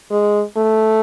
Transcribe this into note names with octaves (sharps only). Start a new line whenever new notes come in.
G#3
A3